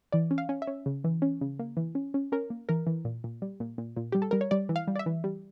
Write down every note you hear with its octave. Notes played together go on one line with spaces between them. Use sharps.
E3 D5
C#4
F5
C#4
E5
C#4
C#3
E3
C#4
C#3
A#3
E3
C#4
C#4
C#4 A#4
A#3
E3 A#4
E3
A#2
A#2
G3
A#2
A#2
A#2
G3 G4
A4
G3 A#4
C#5
G3 D5
E3
F5
G3
D5
E5
E3
G3